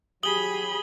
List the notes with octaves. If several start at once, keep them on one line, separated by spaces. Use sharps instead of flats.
F#3 G4 G#4 B5 D#6 F#7 G7